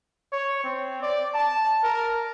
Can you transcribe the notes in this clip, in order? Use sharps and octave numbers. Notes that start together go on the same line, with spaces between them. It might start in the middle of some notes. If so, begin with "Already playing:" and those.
C#5
C4
D5
A5
A#4